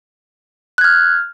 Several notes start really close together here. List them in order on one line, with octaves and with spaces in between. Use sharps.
F#6 G#6 F6